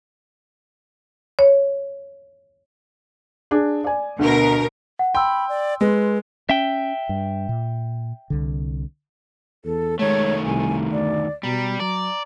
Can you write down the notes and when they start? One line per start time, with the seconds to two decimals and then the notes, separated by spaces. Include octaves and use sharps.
1.39 C#5
3.51 D4 G#4
3.84 D5 G#5
4.19 D2 B2 A#4
4.99 F#5
5.15 G5 B5 C6 E6
5.49 D5
5.81 G#3 B4
6.49 C#4 E5 G5
7.09 G2
7.49 A#2
8.30 C2 D3
9.65 E2 A4
9.99 D#3 G#3 A3 C#5
10.45 C2 G#5
10.92 D2 D5
11.43 B2 G3 A#5
11.80 F#3 D5 A#5